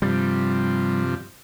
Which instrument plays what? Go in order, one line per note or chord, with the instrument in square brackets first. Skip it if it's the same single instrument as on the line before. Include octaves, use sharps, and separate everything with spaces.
[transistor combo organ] G2 C3 F3 [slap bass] G3